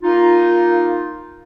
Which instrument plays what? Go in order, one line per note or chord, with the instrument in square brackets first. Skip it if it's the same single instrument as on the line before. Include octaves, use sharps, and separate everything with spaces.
[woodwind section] A#3 D#4 F4